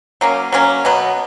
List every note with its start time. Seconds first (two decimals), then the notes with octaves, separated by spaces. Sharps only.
0.21 F#3 A#3 C#4
0.52 F#3 A#3 C#4
0.85 B2 F#3 B3